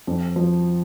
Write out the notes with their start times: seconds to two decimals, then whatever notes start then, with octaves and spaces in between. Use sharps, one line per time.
0.07 F2
0.36 F3